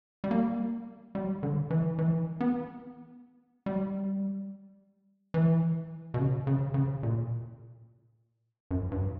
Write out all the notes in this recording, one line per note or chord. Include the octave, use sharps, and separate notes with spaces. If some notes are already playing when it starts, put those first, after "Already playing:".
G3
A#3
G3
D3
E3
E3
B3
G3
E3
B2
C#3
C#3
C#3
A#2
F#2
G2